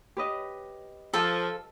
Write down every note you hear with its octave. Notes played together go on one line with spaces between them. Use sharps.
G4 B4 D#5
F3 A4